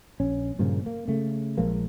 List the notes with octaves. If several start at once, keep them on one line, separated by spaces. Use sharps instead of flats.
A#1 C#4
G2 A#2 C#3 F3
A#3
C#3 A3
A#1 F3 G#3 A#3